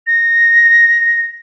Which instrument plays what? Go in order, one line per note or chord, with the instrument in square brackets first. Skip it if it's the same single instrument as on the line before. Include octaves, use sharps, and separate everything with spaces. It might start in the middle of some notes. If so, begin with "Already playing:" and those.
[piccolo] A#6